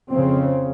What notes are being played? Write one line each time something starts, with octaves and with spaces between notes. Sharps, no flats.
F2 C#3 C4